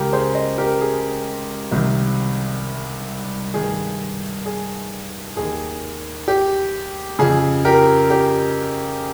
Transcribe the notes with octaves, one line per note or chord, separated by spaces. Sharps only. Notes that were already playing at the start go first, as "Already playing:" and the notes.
Already playing: C#2 C#3 G4 A#4
G#4 C5
C5 D#5
G4 A#4
G#4
C2 C3 D#3
G2 D#3 G#4
G#4
D#2 D#3 G#4
G4
F2 C#3 G#4
G4 A#4
G4